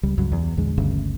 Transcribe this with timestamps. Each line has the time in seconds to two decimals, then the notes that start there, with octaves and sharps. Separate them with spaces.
0.03 C#2 G3
0.18 C#2 G2 F#3
0.32 E2
0.57 A#1 E2 D3 G#3
0.78 G1 D2 G2 C#3